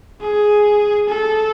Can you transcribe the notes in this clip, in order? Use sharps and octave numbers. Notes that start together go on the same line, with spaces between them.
G#4
A4